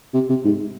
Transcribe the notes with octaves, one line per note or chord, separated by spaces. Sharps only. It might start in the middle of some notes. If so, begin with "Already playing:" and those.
C3
C3
G#2